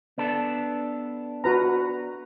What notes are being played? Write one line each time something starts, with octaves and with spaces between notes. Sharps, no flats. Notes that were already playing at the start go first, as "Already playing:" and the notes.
B3 D4 A4
F#4 B4 A#5